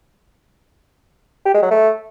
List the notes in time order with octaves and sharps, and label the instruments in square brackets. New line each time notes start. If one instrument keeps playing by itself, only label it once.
[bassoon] G4
G#3
F#3
A3